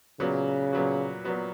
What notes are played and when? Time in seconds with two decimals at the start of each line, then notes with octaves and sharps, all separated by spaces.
0.20 A#2 C#3 F#3 B3 F#4
0.73 A#2 F#3 B3 F#4
1.25 A#2 F#3 B3 F#4